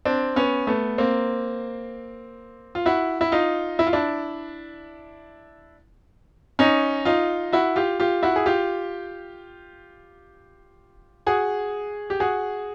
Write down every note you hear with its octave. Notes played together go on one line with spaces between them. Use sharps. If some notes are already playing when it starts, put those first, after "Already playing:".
C4 D4
B3 C#4
A3 B3
A#3 C4
F4
E4 F#4
E4
D#4 F4
E4
F4
D4 E4
C#4 D#4
D#4 F4
E4 F#4
F4 G4
F4 G4
E4 F#4
G#4
F4 G4
F#4 G#4
G4
F#4 G#4